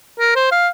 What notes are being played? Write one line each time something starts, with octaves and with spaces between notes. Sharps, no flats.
A#4
C5
F5